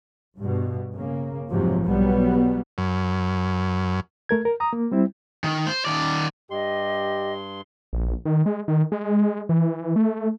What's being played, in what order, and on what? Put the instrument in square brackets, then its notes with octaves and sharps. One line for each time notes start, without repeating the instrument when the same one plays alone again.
[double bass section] G2 B2
C#3 A#3
F1 G#2 C3 F3 F#3 A#3
B1 B2 F#3 G3 B3
[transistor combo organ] F#2
[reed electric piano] A3 A#4 G#6
A#4
A#5 D#6
A#3
G3 C4 E4
[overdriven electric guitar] D#3
C5
D#3 D5
[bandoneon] G2 C6 [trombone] G4 [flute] D#5
[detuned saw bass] A#1
D#3
G#3
D#3
G#3
E3
A3